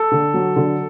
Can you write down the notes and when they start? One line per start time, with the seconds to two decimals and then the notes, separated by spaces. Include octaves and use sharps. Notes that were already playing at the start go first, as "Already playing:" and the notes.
Already playing: A4
0.12 D3
0.34 F#3
0.56 D3